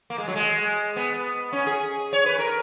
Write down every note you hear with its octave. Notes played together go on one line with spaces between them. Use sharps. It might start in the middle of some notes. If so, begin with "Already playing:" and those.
A#3
G#3
F#3
G#3
B3
C#4
G#4
C#5
B4
A#4